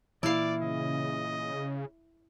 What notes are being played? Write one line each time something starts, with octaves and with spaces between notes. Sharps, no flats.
A#2 E3 E4 D5 F5
C#3 D#5